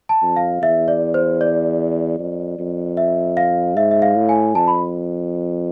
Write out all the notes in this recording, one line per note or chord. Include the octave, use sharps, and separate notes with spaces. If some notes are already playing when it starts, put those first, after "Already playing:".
A5
F2
F5
E2 E5
D5
C5
D5
F2
F2
E5
F5
G#2 E5
E5
F5
A2
G#5
F2 A5
B5